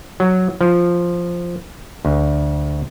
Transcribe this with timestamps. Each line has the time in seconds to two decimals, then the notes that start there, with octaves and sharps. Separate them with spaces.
0.20 F#3
0.61 F3
2.05 D2